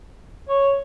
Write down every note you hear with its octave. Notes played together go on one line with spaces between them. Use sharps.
C#5